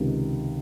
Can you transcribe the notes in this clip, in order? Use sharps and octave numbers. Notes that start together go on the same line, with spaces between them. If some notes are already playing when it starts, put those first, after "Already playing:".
Already playing: C#2 C3 D#3